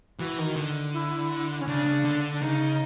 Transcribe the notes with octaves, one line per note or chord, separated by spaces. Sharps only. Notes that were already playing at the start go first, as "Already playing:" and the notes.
E3 F#4
D#3
D3
E4
C#4
C#3 D4
C#3
D3
D4
C#3 D#4